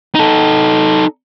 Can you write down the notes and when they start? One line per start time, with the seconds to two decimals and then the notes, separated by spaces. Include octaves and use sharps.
0.15 D#4 A4